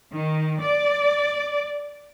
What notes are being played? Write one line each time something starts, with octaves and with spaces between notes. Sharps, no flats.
D#3
D5